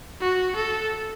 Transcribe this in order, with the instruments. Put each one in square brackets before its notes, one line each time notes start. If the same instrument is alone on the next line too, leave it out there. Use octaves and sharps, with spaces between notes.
[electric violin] F#4
A4